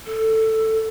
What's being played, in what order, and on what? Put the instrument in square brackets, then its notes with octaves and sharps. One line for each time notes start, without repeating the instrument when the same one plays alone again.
[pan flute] A4